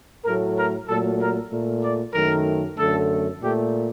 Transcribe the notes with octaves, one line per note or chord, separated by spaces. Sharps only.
A2 F#3 A3 A#4
A#4
A#2 F#3 A3 A4
A#4
A#2 A3
D5
F#2 D#3 A3 A#4
F#2 D3 A3 A4
A#2 A3 G4